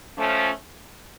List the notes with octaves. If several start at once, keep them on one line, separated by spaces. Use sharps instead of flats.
F3 A3 C#4